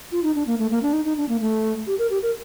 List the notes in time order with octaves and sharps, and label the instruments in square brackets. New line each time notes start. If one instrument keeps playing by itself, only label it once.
[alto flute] F4
D#4
D4
A#3
A3
A#3
D4
D#4
D#4
D4
A#3
A3
G4
A#4
G4
A#4